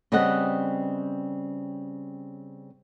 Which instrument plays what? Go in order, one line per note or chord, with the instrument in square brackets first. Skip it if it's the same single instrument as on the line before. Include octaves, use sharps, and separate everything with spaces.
[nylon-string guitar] C#3 G3 C4 B4 D#5 F#5